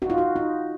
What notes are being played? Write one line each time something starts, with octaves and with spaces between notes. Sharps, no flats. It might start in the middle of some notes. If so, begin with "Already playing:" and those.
D#4 F#4
F4
F#4
D#4